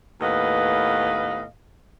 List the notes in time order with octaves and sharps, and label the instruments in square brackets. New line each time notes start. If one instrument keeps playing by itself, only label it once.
[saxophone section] D#2 A2 B3 B4 D#5 F5